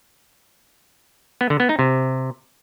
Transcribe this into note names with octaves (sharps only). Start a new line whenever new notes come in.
B3
D3
B3
D#4
C3